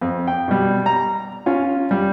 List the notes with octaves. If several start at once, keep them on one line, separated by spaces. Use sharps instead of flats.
F2
G5
B2 G3
A#5
C#4 F4
G3